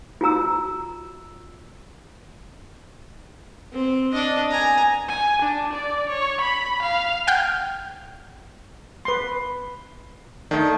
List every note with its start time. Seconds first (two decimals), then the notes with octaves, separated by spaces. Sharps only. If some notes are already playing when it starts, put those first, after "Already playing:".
0.21 F4 F#4 A#5 E6
3.73 C4
4.13 D4 D#5
4.51 G#5 A#5
5.08 G#5
5.42 D4
5.73 D5
6.09 C#5
6.41 B5
6.83 F5
7.27 F#5 G5 F6 G6
9.05 B4 C6
10.51 D#3 A3 D4